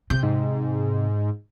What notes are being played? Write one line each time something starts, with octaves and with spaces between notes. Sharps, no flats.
C3 G6
G#2